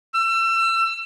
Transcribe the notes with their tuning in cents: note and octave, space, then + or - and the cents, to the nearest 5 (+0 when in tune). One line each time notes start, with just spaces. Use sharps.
E6 +30